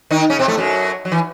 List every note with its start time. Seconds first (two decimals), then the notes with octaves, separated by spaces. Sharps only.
0.11 D#3 D#4
0.30 C#3 C#4
0.39 C3 C4
0.48 A2 A3
0.58 F#2 F#3
1.05 F#3
1.12 E3